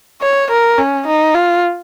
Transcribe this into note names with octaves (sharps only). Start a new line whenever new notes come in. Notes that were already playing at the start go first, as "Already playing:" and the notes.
C#5
A#4
C#4
D#4
F4